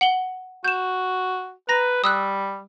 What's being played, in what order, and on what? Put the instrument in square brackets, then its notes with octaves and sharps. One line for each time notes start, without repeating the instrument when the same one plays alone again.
[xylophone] F#5 F#7 G7
[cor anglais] F#4 [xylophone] G6 E7
[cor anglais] B4 [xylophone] A#5 A#6
[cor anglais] G3 [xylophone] D#6 E6 F#6